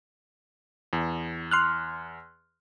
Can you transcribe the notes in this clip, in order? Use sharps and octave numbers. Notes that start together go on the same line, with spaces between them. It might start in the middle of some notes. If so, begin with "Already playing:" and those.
E2
C6 F6 F#6